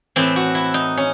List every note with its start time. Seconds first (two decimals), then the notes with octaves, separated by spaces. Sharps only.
0.16 A2 E3 C4
0.36 F#4
0.55 E4
0.74 D#4
0.97 C#4